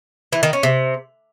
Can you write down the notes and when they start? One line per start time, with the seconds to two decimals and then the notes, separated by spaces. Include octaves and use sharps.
0.33 E3
0.43 D#3
0.53 C#4
0.63 C3